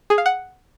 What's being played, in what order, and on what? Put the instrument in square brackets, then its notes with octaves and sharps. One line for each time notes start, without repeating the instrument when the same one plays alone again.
[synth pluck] G#4
F5
F#5